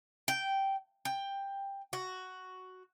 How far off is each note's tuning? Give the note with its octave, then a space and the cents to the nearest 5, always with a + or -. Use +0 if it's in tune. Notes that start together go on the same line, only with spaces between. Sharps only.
G5 -10
G5 +10
F#4 +5